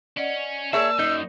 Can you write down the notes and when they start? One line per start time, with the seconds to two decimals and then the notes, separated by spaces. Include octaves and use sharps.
0.17 C#4 D5 D#5 F#5
0.73 A#3 G#4 A#4 C#5 D5 E5 A5 E6
0.99 F#2 D#4